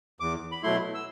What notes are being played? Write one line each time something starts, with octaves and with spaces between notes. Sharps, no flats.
E2 D6
B5
B2 F#3 A3 E4 C6
E6